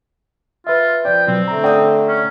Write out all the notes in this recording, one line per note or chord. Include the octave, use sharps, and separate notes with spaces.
F4 B4 E5
F3 B4 D5 G5
B2 F#3 C4
D3 A3 A#5
D5 F#5 G5 A#5 D#6
C#4